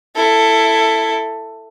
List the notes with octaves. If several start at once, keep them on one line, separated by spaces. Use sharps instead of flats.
E4 A4